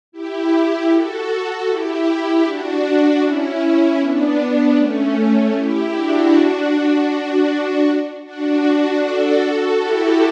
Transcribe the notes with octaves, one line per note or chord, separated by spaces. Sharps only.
E4 G4
F#4 A4
E4 G4
D4 F#4
C#4 E4
B3 D4
A3 C#4
A3 C#4
E4 G4
D4 F#4
D4 F#4
D4 F#4
F#4 A4
F#4 A4
E4 G4